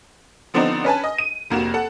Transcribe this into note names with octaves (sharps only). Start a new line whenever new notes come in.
D3 F3 B3 C4 D4 D#4
C#4 B4 G#5 A5
D#5
D#7
F1 A#3 F#4 E7
A4 F#5